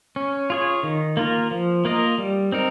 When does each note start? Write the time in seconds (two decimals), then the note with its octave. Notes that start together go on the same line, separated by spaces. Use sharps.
0.16 C#4
0.50 F4 G#4 C#5
0.83 D#3
1.17 A#3 F4 A#4
1.51 F3
1.85 A#3 F4 A#4 D#5
2.18 G3
2.52 C4 D#4 A#4